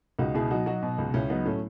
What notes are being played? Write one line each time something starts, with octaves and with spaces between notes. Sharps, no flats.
C#2 D#4 F#4
B2 E4 G#4
F#3 D#4 F#4
F#3 D#4 F#4
B2
C#2
C#2 C#4 E4
F#3 B3 D#4
A2 A3 C#4